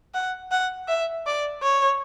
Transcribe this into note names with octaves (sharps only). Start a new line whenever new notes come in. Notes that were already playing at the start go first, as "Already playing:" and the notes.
F#5
F#5
E5
D5
C#5